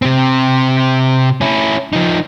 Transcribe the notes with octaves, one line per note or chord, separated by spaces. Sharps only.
C3 C4
C#4 E4
F3 D#4